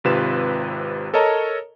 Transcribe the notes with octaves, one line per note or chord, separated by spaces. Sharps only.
G#1 C3 F4 B4 E7
A4 A#4 C#5 D#5 A5 A#5